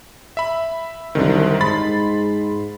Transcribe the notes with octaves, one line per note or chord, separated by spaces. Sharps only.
E5 B5
C2 F#2 D3 D#3
G#2 B5 C6 A6